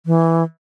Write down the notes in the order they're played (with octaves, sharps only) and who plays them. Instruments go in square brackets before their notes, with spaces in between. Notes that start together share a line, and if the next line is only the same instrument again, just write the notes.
[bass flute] E3